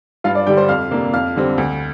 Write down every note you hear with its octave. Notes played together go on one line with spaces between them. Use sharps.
G2 F4 F5
D5
D3 G3 D4 G4 G5
C5 C6
F2 F5 F6
C3 A#3 D4
F2 F5 F6
D3 G3 C4
D2